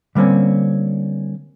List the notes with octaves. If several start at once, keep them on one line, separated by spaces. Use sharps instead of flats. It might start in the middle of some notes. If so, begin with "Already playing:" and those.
D3 G3 A#3 C4 C#4